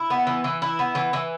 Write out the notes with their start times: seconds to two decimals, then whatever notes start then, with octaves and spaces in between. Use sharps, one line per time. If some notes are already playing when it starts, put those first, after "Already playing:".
Already playing: E4
0.10 B3
0.27 E3
0.44 E3
0.62 E4
0.79 B3
0.95 E3
1.13 E3